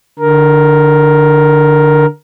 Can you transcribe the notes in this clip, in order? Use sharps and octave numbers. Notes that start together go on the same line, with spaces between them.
D3 A#4